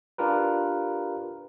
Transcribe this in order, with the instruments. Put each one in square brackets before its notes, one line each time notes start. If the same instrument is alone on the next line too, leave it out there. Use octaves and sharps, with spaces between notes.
[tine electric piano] D4 F4 G4 A#4 B4